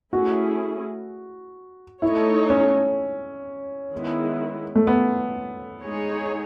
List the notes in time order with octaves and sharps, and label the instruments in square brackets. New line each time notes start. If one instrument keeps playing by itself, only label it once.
[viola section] A3 C#4 E4 G#4 [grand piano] F#4
[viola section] A3 D#4 A4 C#5 [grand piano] E4
[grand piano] C#4
[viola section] D#3 G#3 B3 E4
[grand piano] A3
B3
[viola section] G#3 D#4 G#4 C#5